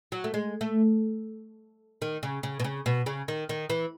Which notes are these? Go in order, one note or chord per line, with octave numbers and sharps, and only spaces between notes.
F#3
A3
G#3
A3
D#3
C#3
C#3
B2
C#3
B2
C#3
D#3
D#3
E3